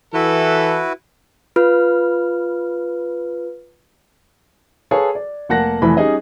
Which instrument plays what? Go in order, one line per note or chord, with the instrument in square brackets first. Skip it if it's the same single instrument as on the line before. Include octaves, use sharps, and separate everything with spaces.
[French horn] E3 [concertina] E4 F#4 B4 [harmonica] A4
[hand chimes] F4 B4 F6
[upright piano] G#4 A4 B4 C#5 F5
D5
F1 A#3 F#5 A5 F#6 A#6
F1 E3 A3 E4 B5
G3 C#4 D#4 G#4 D#5